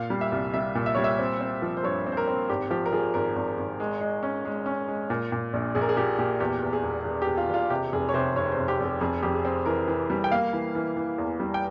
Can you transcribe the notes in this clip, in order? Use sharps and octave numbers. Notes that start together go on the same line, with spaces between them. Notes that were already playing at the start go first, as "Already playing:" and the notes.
Already playing: A#2 F5
G3
E5
C2
G3 E5
A#2
E5
G3 C#5
E5
C4
C4
F3
C5
G2 C#5
C4
C5
A#4
C4
G#1 G4
F3 G4
A#4
F3 G#4
G#1 A#4
G#1
G#1
G#3
G#3
C#4
G#3
C#4
G#3
A#2
A#2
A#1
A#1 G#4
A#4
G#4
A#2 G4
A#2 G4
E2 G4
E2
G#4
E1
E1
G4
E1
F4
E1 F4
C3 G4
F1 G#4
C#5
C3 C5
F1 C#5
C5
F1
G4
F1
G4
F2 G#4
F2 G4
G#4
C4
E3 A#4
E3
G3
G5
A#3 F5
E3
E3
E3
E2
G3
G5